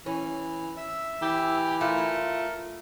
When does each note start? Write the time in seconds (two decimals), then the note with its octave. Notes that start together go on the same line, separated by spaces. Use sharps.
0.06 E3 C#4
0.77 E5 E6
1.22 E3 G4
1.81 A3 F4 A#4